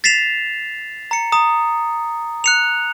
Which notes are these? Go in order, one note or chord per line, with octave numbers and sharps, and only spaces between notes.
A6 B6 C7 E7 F7
A#5 C#7
A#5 D#6
F#6 C#7 F7